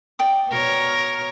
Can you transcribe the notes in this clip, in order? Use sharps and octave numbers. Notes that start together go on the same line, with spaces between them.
D5 G5 D#6
B2 A#4 C#5